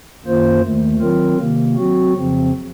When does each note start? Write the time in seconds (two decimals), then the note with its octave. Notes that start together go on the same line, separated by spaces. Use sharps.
0.24 F#2 D#3 A#3 F4 C5
0.63 D#2 D#3 A3
0.99 D#3 F#3 C4 F4 A#4
1.38 C3 D#3 A#3
1.76 F#3 C4 F#4
2.14 F2 C#3 F3 C4